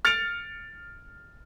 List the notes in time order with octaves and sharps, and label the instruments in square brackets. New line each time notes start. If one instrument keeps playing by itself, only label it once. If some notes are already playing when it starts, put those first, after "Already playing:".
[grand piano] F6 A6 C#7 D7 F7